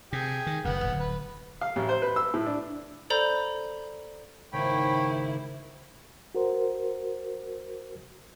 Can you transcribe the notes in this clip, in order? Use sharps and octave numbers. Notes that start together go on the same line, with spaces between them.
C3 G#4 G5
D#3
F#1 F#2 B3 F#5
D1 G1
B4
F5
A1
C5
B4
E6
A2
D4
A4 C5 D5 A#5 B5 G6
G#1 C#3 A#3 E4 C#5 G5 B5
F#4 A#4 C5